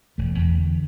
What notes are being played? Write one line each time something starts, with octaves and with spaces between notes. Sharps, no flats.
E1 A3
E2
D3